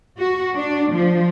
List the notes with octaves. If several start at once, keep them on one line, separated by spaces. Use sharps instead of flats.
F#4
D4
F3